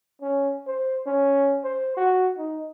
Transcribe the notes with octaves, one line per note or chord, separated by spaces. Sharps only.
C#4
C5
C#4
C5
F#4
D#4